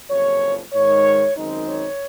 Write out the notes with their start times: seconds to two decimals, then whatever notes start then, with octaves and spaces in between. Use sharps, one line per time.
0.11 F#1 F2 C#3 F3 C#5
0.73 G#2 D#3 G#3 C#5
1.36 F#2 D#3 G#3 C4 D#4
1.68 C#5